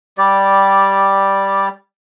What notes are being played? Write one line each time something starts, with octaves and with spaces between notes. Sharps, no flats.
G3 G4 D5